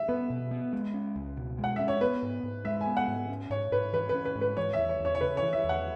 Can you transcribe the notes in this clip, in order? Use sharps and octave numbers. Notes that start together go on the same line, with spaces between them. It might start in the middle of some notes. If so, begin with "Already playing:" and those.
Already playing: E5
B3 B4
B2
B3
G#3
C#4
C#2
B2
G#3
F#5
C#4 E5
C#5
B3 B4
G#2
G#2
G#3 E5
G#5
B3
F#5
G#2
C#4
G#2 C#5
G#2 B4
E3 B4
B4
C#4
B4
G#2
B4
E3 C#5
E5
E2
C#5
E2 C#5
C#5
C#3 B4
C#5
E3
E5
E2
F#5